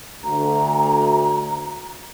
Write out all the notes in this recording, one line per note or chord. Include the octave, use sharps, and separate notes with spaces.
D2 A#5